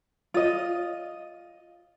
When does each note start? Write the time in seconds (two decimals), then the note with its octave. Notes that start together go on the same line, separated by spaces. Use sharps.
0.34 F4 D#5